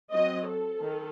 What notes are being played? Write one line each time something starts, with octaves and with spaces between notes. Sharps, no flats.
F#3 C4 D#5
A4
D#3